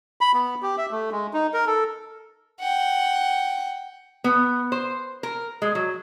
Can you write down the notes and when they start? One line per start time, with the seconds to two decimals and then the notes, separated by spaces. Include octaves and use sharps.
0.21 B5
0.34 B3
0.63 G4
0.78 E5
0.91 A3
1.12 G#3
1.34 D#4
1.54 A#4
1.67 A4
2.60 F#5 G5
4.24 B3
4.72 C5
5.23 A#4
5.62 G#3
5.75 F#3